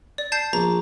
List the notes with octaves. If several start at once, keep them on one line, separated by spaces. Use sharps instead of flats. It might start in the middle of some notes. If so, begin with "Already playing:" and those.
D5
A5 G6 C7
A#1 A#5